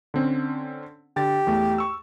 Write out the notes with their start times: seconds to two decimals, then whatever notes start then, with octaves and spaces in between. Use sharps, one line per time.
0.14 D3 C4 C#4
1.16 D3 G4 A6
1.47 E2 A3
1.78 C#6 E6